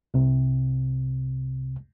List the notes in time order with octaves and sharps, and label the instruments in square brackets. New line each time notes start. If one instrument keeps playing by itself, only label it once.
[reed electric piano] C2 C3